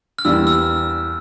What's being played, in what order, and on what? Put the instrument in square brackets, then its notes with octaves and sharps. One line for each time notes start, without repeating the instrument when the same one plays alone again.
[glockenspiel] F6
[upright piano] E2 E3 G3 A#3 [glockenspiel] E6
[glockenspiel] E6